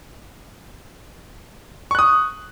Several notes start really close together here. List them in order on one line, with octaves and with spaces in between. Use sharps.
C#6 F#6 D#6